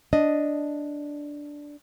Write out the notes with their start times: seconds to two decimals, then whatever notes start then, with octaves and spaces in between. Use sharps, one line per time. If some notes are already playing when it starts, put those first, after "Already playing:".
0.13 D4 D#5